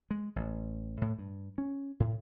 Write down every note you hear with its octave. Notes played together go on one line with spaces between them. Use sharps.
G#3
A1
A2
G2
C#4
A2